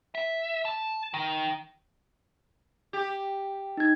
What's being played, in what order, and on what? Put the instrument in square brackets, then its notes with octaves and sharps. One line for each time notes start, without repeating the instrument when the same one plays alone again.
[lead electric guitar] E5
A5
D#3
[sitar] G4
[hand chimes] D#4 G#6